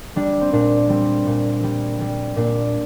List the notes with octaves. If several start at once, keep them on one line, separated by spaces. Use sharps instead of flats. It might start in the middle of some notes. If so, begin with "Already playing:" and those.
G3 D4
C4
A#2 D4
G3 C4
A#2
G3
G3
A#2 D4